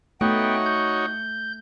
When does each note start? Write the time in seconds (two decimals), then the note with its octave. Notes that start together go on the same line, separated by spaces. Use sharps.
0.21 A3 B3 D#4 F#4 C#5 G5
0.65 G6